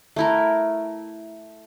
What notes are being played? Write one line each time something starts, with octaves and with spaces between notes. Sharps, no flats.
A3 E4 A#4